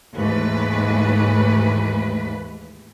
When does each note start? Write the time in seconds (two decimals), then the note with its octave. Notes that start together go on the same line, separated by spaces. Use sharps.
0.16 D#2 G#2 E3 A3 B4